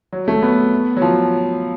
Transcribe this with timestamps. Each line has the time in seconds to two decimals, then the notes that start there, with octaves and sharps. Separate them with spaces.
0.13 F#3
0.28 A3
0.42 B3
0.97 F#3
1.02 F3